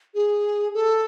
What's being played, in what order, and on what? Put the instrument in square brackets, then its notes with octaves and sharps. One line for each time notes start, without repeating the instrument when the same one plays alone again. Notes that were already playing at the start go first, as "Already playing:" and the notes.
[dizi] G#4
A4